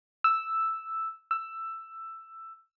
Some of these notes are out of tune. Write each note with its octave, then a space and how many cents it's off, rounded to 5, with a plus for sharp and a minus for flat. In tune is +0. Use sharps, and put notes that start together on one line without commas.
E6 +0
E6 +10